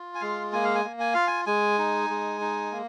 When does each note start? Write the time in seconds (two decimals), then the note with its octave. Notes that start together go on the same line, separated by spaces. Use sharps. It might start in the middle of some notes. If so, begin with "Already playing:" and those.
Already playing: F4
0.15 G#5
0.21 G#3 F5
0.53 A#3 G#5
0.65 F5
0.75 G#5
0.84 A#3
1.00 G#5
1.14 F4 F5
1.27 G#5
1.46 G#3 G#5
1.79 D#4
2.10 G#3
2.41 D#4
2.72 A#3